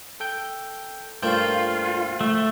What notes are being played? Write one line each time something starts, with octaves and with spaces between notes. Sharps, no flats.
A4 G5 G6
G2 A3 A#3 F4 C5 G5 A5
A3